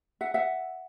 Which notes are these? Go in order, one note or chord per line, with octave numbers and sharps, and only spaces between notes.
E5 F#5
E5 F#5